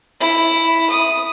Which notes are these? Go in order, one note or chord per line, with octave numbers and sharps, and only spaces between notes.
E4
D#6